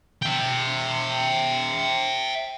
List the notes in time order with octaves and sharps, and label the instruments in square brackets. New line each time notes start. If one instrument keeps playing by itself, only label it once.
[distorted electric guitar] E5 G5